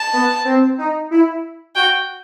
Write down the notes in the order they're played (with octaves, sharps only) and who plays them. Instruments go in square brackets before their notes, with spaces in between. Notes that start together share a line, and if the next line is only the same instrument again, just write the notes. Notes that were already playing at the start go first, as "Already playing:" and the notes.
Already playing: [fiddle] A5
[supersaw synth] B3
C4
D#4
E4
[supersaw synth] F#4 [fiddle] G5